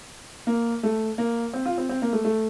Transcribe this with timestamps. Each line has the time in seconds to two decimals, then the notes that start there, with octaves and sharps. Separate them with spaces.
0.47 A#3
0.83 A3
1.18 A#3
1.53 C4
1.66 F4
1.78 C4
1.89 C4
2.02 A#3
2.13 A3
2.25 A3